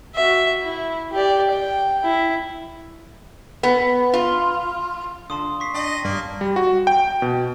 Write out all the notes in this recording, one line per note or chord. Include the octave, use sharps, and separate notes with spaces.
F#4 E5
E4
G4 D5
G5
E4
B3
F4
D3 F4 G5 A5 C6 D#6
C#6 B6 C7
D4 D#5 G5
A#6
G2 A#3 D4 D5
G3
F#4
G5
B2